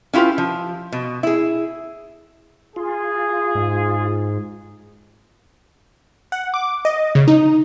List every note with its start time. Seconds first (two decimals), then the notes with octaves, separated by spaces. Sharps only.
0.13 C#4 E4 F4 G4 B4
0.38 F3
0.92 B2
1.23 E4 G#4
2.76 F4 G#4
3.55 G#2
6.32 F#5
6.54 D6
6.85 D#5
7.15 C#3
7.28 D#4